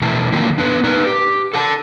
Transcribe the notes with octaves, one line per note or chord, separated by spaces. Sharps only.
B2 E3 A3 E4 A5
D3 D#3 F3 F#3 A3 A#3
B3 D4 B4
D4 D#4 B4
G4
A4 F#5 A5